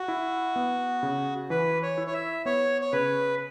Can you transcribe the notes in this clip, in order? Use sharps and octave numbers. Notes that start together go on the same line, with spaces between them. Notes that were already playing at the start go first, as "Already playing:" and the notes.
Already playing: F#4
E4
B3
C#3
E3 B4
C#5
E4
C#5
E5
B3 C#5
C#5
C#3 B4